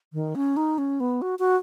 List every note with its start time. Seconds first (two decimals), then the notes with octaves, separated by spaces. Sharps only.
0.13 D#3
0.35 C#4
0.57 D#4
0.78 C#4
1.00 B3
1.22 F#4
1.39 F#4